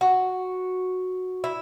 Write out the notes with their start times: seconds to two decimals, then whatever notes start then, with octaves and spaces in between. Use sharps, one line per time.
0.01 F#4
1.44 E4